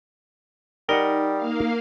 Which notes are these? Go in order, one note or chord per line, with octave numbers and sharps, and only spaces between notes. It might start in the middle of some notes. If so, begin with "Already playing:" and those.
G3 D#4 A#4 D#5 F#5
A#3 F5